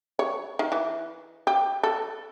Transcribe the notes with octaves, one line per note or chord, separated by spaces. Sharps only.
C#5
D#3
E3
G4
A4